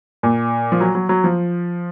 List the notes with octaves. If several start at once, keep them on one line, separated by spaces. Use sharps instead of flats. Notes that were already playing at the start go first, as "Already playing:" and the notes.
A#2
F3
F#3
F#3
F#3
F3